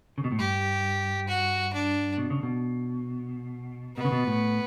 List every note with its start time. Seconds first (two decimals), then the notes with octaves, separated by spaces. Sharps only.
0.18 C#3
0.24 B2
0.32 A2
0.38 G2 G4
1.28 F#4
1.73 D4
2.17 B2
2.30 C#3
2.43 B2
3.97 B2 B3
4.04 C#3
4.12 B2
4.27 A2